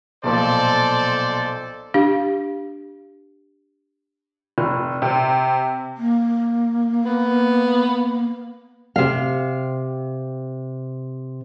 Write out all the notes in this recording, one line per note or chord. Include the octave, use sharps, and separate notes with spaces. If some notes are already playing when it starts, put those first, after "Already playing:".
B1 A#2 F3 A4 C5 D5
D4 G4 F5
F1
C3
A#3
B3
C3 F5